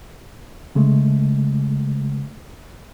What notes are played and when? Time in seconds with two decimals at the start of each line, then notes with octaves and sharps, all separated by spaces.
0.75 C#3 G#3 A3